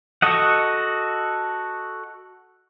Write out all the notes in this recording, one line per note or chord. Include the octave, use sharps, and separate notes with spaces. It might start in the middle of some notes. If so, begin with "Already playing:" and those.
F#4 A4 D#5 F#5